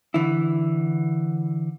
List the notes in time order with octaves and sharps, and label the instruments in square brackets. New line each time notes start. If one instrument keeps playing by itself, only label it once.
[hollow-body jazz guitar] D3 E3 E4